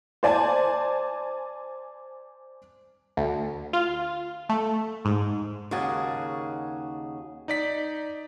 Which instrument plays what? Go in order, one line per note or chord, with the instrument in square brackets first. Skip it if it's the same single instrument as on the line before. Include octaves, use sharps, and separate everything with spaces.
[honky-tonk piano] C5 D5 G#5 A5
[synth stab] D2
F4
A3
G#2
[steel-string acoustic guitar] D#2 C#3 F#4 G#4 A5
[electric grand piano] D#4 D5 B6